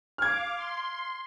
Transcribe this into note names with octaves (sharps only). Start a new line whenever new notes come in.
F5 D6 F6 G#6
C6